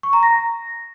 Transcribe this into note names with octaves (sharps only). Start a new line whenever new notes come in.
C#6
A#5
A#6